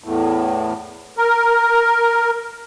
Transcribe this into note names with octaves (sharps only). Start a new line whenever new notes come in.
E2 A2
A#4